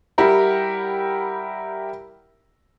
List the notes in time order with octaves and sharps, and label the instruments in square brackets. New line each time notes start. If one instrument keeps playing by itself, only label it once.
[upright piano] G3 E4 G4 A#4 F#5